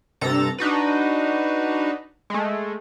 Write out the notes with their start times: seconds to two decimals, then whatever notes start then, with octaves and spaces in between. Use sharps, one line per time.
0.21 G2 C3 A4 A#5 A6
0.58 D4 D#4 F#4 B4
2.30 G#3 A3